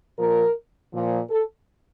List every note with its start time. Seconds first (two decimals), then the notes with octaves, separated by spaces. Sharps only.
0.19 A#2 F3 A#4
0.93 A#2 F3
1.30 A4